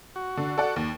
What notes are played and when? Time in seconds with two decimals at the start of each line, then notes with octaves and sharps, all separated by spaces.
0.16 F#4
0.37 D3
0.58 A4 D5 F#5
0.76 D#2